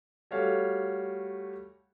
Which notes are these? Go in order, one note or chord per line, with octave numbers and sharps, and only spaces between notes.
G3 A3 F#4 C#5 F5